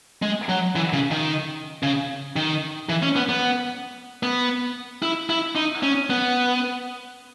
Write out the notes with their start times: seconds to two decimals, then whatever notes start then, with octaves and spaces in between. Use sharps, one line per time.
0.22 G#3
0.49 F#3
0.76 E3
0.93 C#3
1.11 D#3
1.83 C#3
2.36 D#3
2.89 E3
3.03 C#4
3.16 B3
3.29 B3
4.23 B3
5.03 E4
5.30 E4
5.56 D#4
5.83 C#4
6.10 B3